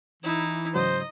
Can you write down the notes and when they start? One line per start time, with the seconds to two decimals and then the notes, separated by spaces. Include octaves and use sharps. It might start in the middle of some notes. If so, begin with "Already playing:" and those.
0.23 E3 D#4 E4
0.75 G#2 C#3 F#3 C5 D#5